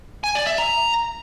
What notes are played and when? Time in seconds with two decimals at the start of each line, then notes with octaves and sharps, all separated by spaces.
0.24 G#5
0.35 D5
0.47 E5
0.58 A#5